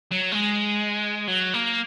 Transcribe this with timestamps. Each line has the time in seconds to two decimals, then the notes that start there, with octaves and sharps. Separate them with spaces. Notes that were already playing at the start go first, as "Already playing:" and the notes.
0.11 F#3
0.31 G#3
1.27 F#3
1.54 A#3